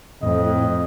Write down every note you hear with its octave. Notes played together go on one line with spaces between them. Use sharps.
F2 A2 D#5